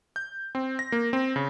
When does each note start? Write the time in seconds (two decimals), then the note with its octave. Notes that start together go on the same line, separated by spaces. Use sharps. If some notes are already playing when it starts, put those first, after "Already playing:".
0.16 G6
0.55 C4
0.79 A#6
0.92 A#3
1.13 C4
1.36 C#3